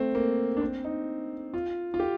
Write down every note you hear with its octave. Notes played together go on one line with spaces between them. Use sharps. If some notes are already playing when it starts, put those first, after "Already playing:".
Already playing: A3 C4
A#3
D4
C4
D#4
F4
F4
G4